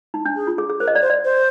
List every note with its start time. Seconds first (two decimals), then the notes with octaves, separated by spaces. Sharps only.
0.14 D#4
0.25 D4
0.36 G#4
0.47 F4
0.58 G#4
0.70 G#4
0.80 A#4 C5
0.88 D#5
0.95 D5
1.02 C5
1.10 D5
1.25 C5